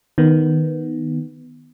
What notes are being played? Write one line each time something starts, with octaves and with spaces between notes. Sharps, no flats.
D#3 B3